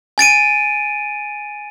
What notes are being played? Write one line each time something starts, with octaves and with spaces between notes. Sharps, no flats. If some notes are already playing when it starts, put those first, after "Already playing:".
G#5 A6 D7 D#7